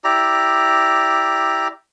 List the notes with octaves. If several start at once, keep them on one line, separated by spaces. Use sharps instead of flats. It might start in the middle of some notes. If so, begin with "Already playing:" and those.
E4 G4 D5 A#5